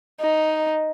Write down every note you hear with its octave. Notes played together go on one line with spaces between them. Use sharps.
D#4